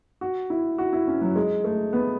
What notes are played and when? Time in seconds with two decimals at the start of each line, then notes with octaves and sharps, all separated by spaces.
0.21 F#4
0.50 E4
0.78 F#4
0.93 E4
1.07 C#4
1.22 F#3
1.36 G#3
1.64 A3
1.93 B3